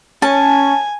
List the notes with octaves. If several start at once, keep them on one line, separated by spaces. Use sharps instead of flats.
C#4 G#5 A5